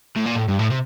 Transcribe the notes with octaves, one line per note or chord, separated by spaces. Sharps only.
A2
A#2
A2
G2
A2
C3